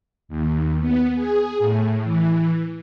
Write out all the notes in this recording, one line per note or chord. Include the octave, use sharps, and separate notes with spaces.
D#2
B3
G#4
A2
E3